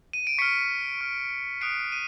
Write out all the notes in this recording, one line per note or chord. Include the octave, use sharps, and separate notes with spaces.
D#7
D7
C#6 F6 B6 C#7
C#6 F6
D#6 F#6 C7 D7
D#7